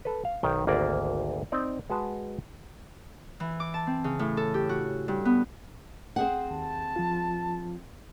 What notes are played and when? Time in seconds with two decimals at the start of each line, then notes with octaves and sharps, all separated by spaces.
0.05 A4 B4
0.25 F5
0.43 B1 D#3 G5
0.67 G#1 D2 A#3 D5
1.52 C4 D#4 D5
1.90 G#3 F#4 B4 A5
3.40 E3
3.60 D6
3.74 A5
3.87 C4
4.04 C#3
4.19 A2
4.37 A4
4.54 G4
4.69 F#4
5.08 G2
5.25 B3
6.16 C4 G#4 F#5
6.50 D#2 A5
6.96 F3 F4